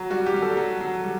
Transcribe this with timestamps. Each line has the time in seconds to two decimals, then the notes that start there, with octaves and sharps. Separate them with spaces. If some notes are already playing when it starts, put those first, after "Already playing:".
Already playing: F#3
0.10 G3 F#4
0.26 G4
0.34 G3
0.42 A4
0.57 F#3
0.81 F#3
1.04 G3